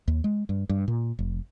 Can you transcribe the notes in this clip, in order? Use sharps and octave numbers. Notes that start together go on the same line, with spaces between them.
D#2
G#3
G2
G2
A#2
F1